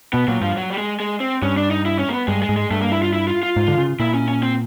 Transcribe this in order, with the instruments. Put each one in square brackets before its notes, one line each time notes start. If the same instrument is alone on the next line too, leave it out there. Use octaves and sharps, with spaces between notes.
[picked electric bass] B2 [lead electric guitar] B3
[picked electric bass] A#2 [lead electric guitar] F#3
[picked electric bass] G2 [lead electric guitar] F3
[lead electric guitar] F#3
G3
G#3
G#3
C4
[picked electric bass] G2 [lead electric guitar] C#4
[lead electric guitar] D4
D#4
E4
C#4
A#3
B3
[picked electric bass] G2 [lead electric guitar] G#3
[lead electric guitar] G#3
[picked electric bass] G#2
[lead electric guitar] G#3
[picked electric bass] G2 [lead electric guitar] A3
[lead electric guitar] A#3
E4
F4
E4
F4
F4
[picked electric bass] G#2
D3
C#3
[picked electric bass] A#2 [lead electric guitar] E4
[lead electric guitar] C#4
C#4
C4